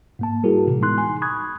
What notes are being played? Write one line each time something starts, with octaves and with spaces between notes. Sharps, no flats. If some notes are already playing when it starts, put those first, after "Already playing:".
G#2 A#3 A5
G3 E4 F#4 G#4 A#4
A2 C3 E3
G#3 B3 D#4 C6 F#6
G#5 C6
B5 C#6 D#6 F#6 G#6